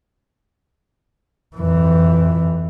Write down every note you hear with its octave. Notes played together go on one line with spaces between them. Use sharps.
F2 E3